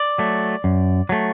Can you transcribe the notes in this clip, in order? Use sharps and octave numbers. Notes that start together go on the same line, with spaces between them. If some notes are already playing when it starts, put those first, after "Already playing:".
Already playing: D5
F#3 A3
F#2
F#3 A3